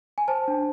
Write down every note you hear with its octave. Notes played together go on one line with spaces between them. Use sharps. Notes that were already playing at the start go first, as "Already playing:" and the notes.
G#5
C5 A5
D4